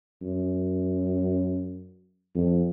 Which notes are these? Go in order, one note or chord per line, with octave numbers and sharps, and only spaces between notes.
F#2
F2